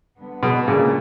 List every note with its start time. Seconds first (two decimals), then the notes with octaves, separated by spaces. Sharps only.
0.18 D3 G3 B3
0.43 B2
0.67 A#2 C#3